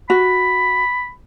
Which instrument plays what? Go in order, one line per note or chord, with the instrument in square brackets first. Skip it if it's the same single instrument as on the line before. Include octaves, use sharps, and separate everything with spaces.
[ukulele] F#4 [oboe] B5